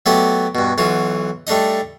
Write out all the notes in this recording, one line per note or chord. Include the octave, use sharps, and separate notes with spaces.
F#3 A3 B3 G4 D5 D#5
G2 B2
B1 E3 F4 F#4
G3 A3 D4 D#4 D#5